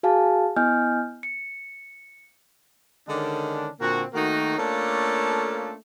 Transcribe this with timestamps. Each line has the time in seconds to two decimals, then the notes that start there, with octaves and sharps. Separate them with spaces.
0.03 F#4 G#4 F5 G#5 A5
0.56 B3 E4 D#5 G#5 F6 G6
1.23 C#7
3.08 D3 D#3 G#3 C#4 D4
3.80 A#2 D3 A#3 C4 F#4
4.13 D#3 A3 A#3 D#4 F#4
4.58 A3 A#3 C#4 D4 F4 A4